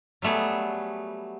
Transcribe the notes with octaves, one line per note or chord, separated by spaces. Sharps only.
F#3 G3 A3 B3 G#4